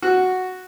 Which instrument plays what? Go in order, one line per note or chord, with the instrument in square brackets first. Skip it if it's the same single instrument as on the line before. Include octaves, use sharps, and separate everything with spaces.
[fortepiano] F#4